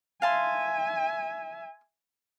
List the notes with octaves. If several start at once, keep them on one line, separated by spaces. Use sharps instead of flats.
E5 F5 G#5 A5 C6